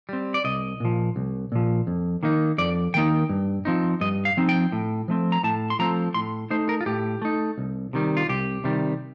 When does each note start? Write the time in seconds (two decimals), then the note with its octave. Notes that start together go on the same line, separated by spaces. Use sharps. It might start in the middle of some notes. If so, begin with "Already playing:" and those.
0.09 G3 C4
0.34 D5
0.44 C2 D#5
0.80 A#2 F3
1.16 C2
1.52 A#2 F3
1.87 F2
2.23 D#3 A#3 D#4
2.58 F2 D5
2.94 D#3 A#3 D#4 G5
3.29 G2
3.65 F3 C4 D#4
4.01 G2 D#5
4.25 F5
4.37 F3 C4 D#4
4.49 G5
4.72 A2
5.08 F3 A3 C4
5.32 A#5
5.43 A2 A5
5.70 C6
5.79 F3 A3 C4 A#5
6.14 A2 C6
6.50 A3 D#4 C5
6.69 A#4
6.81 F4
6.86 A2 G4
7.22 A3 D#4
7.58 C2
7.93 C3 D#3 G3
8.17 F4
8.29 C2 G4
8.64 C3 D#3 G3